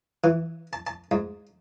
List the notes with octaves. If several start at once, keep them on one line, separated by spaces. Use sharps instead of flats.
E3
A5
A5
G#2